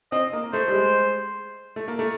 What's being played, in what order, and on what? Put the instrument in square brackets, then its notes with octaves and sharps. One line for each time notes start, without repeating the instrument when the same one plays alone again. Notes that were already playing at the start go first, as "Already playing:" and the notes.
[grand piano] C4 [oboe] D#5
[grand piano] A#3
[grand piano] A3 [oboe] C5
[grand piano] G3
G#3
A3
A#3
A3